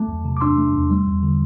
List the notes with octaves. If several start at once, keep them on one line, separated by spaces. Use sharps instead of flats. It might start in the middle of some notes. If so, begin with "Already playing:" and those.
Already playing: A3 A5 D6
E2
C3
D6
D4 C6 E6
A3
E2
G3
E2
D3